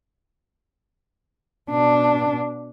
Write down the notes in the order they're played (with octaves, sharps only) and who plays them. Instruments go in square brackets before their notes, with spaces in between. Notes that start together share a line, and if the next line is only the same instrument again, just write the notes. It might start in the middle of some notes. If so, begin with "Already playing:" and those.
[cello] B2 D4